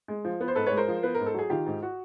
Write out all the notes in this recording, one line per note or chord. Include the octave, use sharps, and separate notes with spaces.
G#3
F3
B3
C5
G#2 A4 B4
B4 C#5
G#3
A#4 C5
F3
B3 B4
G#2 A#4
A4
F#3 G#4
D#3 F4 G4
G#2
F#4